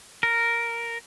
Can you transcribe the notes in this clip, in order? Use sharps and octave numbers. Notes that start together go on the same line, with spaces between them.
A#4